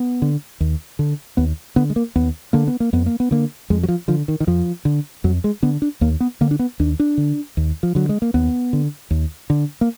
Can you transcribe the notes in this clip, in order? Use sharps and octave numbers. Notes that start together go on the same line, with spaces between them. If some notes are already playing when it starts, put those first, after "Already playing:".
Already playing: B3
D3
D#2
D3
D#2 B3
D3 B3
G#3
A#3
D#2 B3
D3 A#3
B3
A#3
F2 B3
A#3
B3
D3 A#3
F2 G#3
F#3
F3
D3 F3
D#3
D#3
F2 F3
D3
F2 F#3
G#3
D3 B3
D4
D#2 A#3
B3
D3 A#3
D4
B3
D#2 D4
D4
D3
D#2
F3
D3 F#3
G#3
A#3
D#2 B3
D3
D#2
D3
A#3